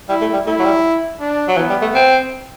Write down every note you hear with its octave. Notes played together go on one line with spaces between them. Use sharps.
G3 E4
A3
G3
A3 E4
F#3
G3
D4
F#3
E3 B3
G3
A3
C4